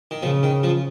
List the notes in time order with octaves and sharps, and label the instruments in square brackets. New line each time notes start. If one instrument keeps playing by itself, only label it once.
[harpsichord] D#3
[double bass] C#3 [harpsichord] F3
[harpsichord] D#3
F3